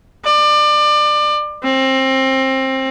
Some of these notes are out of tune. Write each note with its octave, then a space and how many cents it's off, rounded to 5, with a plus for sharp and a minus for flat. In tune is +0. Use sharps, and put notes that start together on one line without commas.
D5 +25
C4 +25